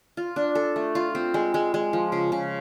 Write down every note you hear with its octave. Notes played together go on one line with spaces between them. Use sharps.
F4
D4
A4
A3
F4
C4
G#3
G#3
G#3
F3
C#3
C#3